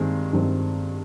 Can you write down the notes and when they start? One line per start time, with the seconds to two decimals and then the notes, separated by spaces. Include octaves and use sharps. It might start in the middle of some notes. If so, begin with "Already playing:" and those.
Already playing: G2 D#3 G#3 C4
0.33 G2 D#3 G#3 C4